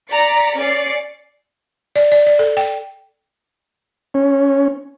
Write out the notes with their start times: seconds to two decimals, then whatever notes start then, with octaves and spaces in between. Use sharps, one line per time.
0.11 D5 A#5 B6 C#7
0.58 C#4 D5 C7 C#7
1.96 D5
2.12 D5
2.27 D5
2.39 A4
2.57 G5
4.14 C#4